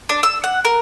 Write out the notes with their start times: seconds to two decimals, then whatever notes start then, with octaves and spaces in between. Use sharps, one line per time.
0.09 D4
0.23 E6
0.44 F#5
0.65 A#4